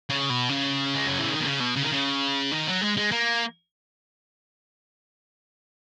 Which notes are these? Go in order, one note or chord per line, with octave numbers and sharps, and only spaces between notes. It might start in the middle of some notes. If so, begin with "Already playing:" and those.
C#3
B2
C#3
G#3
F#3
E3
D#3
B2
C#3
B2
C#3
D#3
C#3
D#3
F#3
G#3
G#3
A#3